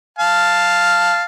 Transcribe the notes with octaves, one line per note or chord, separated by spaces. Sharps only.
F5 A5